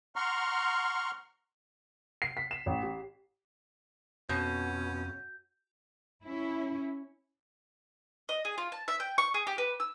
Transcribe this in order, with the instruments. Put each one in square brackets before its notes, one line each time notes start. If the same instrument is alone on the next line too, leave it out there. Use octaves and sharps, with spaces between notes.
[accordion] F#5 A#5 C6 C#6 F6
[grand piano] C7
B6
E7
A1
G4
[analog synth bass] F2 [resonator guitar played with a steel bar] B2 [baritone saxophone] C#4 [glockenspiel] G6
[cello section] C#4 E4
[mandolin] D#5
G#4
F4
A5
E5
G5
C#6
G#4
G4
B4
E6